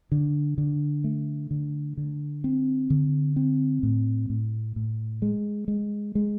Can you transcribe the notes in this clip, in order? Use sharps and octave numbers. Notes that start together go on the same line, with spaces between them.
D3
D3
A3
D3
D3
C4
D3
C4
A2
A2
A2
G#3
G#3
G#3